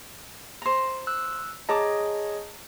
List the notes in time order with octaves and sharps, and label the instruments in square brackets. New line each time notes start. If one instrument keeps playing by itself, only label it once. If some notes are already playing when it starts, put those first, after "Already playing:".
[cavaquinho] C5 A#5
[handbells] E6 F#6
[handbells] G#4 C#5 D#5 [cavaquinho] A5 A#5 D6